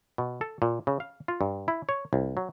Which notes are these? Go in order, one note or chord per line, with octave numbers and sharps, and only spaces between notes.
B2
A4
A#2
C#3
F5
F4
G2
E4
C#5
C2
F#3